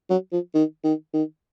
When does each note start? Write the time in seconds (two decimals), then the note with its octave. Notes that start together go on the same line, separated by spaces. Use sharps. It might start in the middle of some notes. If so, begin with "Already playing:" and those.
0.10 F#3
0.32 F3
0.54 D#3
0.84 D#3
1.14 D#3